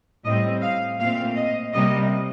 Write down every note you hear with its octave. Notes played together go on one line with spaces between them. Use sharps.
A2 G3 C4 D#5
F5
A#2 A3 C4 F5
D#5
C3 G3 A#3 D#5